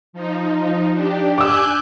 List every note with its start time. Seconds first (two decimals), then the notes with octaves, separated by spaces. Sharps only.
0.13 F3 D#4
0.92 D4 G4
1.38 G#5 D6 E6 F#6 G6